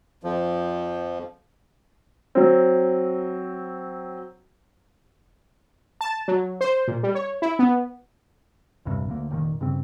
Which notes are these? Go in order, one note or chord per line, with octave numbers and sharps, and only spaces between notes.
F2 F3
F#3 C4
A5
F#3
C5
A#2
G3
C#5
E4
B3
E1 A#1 G2 C3
D2 A#3
F1 A#2 D#3
G2 C#3 C4